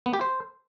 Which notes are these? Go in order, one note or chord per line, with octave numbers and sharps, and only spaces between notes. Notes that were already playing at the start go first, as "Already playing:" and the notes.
B3
G4
C5